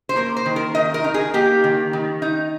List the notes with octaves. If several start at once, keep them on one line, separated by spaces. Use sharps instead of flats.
C5
A#3 A#4
C5
D#3
A#4
D#3 D#5
A#4
D#4
G#4
A#3 G4
D#3
D#3
D#4